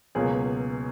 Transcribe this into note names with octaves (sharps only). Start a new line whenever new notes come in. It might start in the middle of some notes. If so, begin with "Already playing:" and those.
C#2 B2 F#3 A#3 G#4